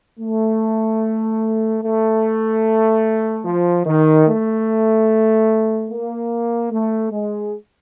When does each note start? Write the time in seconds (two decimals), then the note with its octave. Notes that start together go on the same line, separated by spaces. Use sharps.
0.19 A3
1.82 A3
3.45 F3
3.85 D#3
4.27 A3
5.90 A#3
6.71 A3
7.12 G#3